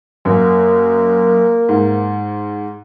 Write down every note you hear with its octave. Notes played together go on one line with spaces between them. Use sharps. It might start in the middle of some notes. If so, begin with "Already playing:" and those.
F#2 A#3
G#2